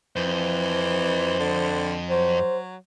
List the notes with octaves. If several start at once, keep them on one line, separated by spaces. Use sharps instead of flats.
F2 E3 C5
D3
F#3 C5